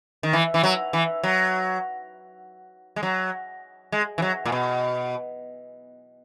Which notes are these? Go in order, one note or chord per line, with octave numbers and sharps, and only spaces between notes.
D#3
E3
E3
F#3
E3
F#3
G#3
F#3
G#3
E3
F#3
A#2
B2